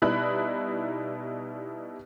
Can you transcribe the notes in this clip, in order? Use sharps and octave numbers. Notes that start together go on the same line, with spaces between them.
B2 G3 D#4 E4 B5 F#6